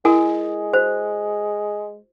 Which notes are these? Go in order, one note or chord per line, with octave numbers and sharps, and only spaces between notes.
G#3 E4 A#4 G#5 D#6
F#4 C5